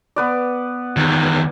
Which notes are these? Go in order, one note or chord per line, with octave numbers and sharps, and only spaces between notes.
B3 B4 D5
E2 D#3